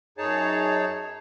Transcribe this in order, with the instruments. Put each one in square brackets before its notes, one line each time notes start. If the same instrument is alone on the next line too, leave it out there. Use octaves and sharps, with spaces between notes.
[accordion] F#2 D#4 G#4 C#5 A5